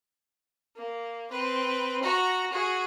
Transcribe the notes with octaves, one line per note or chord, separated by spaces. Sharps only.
A#3
C4 B4
F#4 A#5
F#4 G#4